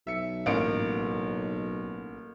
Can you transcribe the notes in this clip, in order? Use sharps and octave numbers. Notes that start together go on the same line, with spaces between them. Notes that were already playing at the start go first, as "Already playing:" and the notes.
B1 E5 C#7
A1 A#3 D7